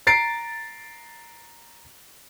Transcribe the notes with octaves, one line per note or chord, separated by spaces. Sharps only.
A#5 A6 C7 D7